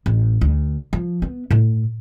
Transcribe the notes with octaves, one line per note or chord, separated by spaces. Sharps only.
A1
D2
F3
B3
A2